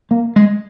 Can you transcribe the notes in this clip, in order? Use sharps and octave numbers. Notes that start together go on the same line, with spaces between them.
A#3
G#3